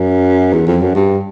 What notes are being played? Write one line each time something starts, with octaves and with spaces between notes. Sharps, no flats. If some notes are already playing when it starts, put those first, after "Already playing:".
Already playing: F#2
E2
F2
F#2
G2